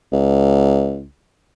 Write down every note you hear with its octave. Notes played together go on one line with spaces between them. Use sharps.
C#2